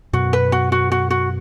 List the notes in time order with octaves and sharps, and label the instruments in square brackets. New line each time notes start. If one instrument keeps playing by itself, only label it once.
[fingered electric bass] F#2 B2 [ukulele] F#4
[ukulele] B4
F#4
F#4
F#4
F#4